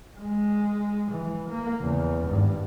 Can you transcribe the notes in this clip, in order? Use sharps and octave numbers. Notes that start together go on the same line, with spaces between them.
G#3
E3
A#3
E2 C#3
G#1 G2